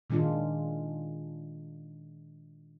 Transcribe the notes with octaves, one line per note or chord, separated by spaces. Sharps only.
A#2 D#3 G#3 D4 F4